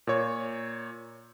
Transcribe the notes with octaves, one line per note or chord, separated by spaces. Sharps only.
A#2 C#5